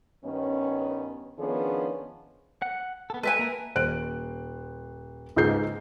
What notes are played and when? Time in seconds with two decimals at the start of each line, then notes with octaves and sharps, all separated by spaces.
0.25 G2 D#3 B3 C#4
1.38 D#3 F3 B3 C#4 D4 G#4
2.62 F#5
3.10 B3 A4
3.23 A4 B4 E5 G#5
3.39 A#3 A#4
3.75 D#1 C5 F#6 D7
5.36 C#2 G#2 G#4 G6 C7